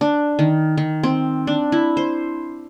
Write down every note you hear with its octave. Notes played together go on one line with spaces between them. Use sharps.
D4
D#3
D#3
C4
D4
E4
C5